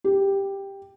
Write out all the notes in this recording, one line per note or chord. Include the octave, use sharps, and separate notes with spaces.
G4